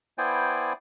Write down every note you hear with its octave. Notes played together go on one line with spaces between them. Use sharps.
B3 E4 C5 D5 G5 G#5